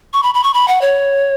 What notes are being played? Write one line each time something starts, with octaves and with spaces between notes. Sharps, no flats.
C#6
B5
B5
C#6
B5
F#5
C#5